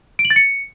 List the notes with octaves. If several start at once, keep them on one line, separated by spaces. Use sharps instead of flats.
D7
F#7
A6
C#7